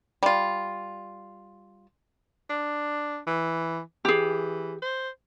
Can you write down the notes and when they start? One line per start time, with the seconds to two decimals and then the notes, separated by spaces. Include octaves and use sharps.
0.23 G3 F4
2.50 D4
3.27 E3
4.05 E3 G4 G#4
4.82 C5